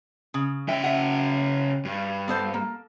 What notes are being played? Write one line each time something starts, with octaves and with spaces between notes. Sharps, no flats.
C#3
C#3 E5 G5
E5 F#5
G2
B3 A4 C5
A#3